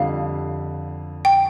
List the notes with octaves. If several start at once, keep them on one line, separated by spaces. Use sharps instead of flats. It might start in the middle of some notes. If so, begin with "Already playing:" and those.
Already playing: F2 D3 G3 F5
G5